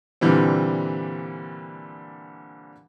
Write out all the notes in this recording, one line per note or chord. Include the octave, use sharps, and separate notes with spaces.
A#2 D3 E3 G3 C4